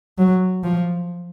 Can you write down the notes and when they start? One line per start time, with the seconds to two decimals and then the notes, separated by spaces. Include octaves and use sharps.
0.18 F#3
0.64 F3